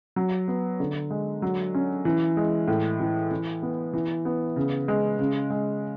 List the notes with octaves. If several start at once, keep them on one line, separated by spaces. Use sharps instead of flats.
F#3
B3
D3
G#3
F#3
C#4
E3
G#3
A2
E3
E3
B3
E3
B3
C#3
G#3
C#3
G#3